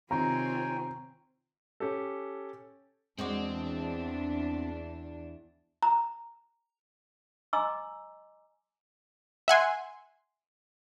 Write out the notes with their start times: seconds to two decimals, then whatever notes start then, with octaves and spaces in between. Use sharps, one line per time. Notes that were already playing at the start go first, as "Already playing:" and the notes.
0.11 C3 D#3 C4 F4 C#5 G5 G#5 A#5
1.80 C#4 G4 A4
3.19 E2 G#3 C4 D4 F#4 D5
5.83 A#5
7.53 D#5 G#5 A#5 C6 D6 E6
9.48 E5 F#5 G#5 C6